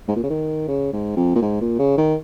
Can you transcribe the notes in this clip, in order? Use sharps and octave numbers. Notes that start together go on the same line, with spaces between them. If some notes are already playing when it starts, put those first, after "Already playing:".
G#2
A#2
C#3
D#3
C#3
G#2
F2
A#2
G#2
A#2
C#3
D#3